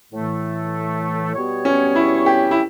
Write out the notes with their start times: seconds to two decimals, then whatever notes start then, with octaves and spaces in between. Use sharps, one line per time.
0.12 A2 E3 A3
1.34 B2 G3 B3 F#4 C#5
1.65 C#4
1.96 E4
2.26 G4
2.51 E4